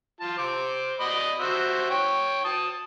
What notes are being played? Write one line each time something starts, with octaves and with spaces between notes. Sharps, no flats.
F4 A5
C5 D6
D5 D#5 B5
F#4 C5 E5
C#5 G5
A5 D#6